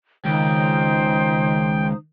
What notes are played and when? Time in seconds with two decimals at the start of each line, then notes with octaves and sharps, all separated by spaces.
0.25 C#2 D#3 D#4 C5 G5 D#6